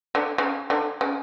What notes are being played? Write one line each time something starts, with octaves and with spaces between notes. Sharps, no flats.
D3
C#3
D3
C#3